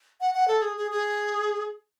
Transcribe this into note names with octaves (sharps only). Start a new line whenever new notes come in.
F#5
F#5
A4
G#4
G#4
G#4